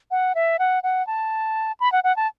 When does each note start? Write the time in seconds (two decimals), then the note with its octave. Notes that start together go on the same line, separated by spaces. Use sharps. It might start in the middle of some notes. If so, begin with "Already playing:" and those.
0.11 F#5
0.35 E5
0.59 F#5
0.83 F#5
1.07 A5
1.80 B5
1.92 F#5
2.04 F#5
2.16 A5